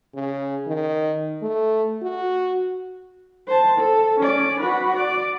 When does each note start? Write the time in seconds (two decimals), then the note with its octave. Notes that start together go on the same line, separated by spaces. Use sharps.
0.14 C#3
0.67 D#3
1.42 A3
2.02 F#4
3.47 C5 A5
3.78 A4
4.20 C#4 D5
4.61 F#4 B4
4.96 D5